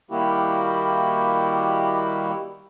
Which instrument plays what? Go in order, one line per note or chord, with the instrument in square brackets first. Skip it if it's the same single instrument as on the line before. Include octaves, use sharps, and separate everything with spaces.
[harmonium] D#3 G3 A#3 E4 F#4 G4